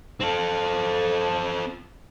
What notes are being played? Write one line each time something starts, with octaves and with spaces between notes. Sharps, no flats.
C4 A4